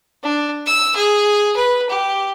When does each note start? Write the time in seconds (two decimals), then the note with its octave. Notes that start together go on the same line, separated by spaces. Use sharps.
0.23 D4
0.66 E6
0.96 G#4
1.56 B4
1.89 G4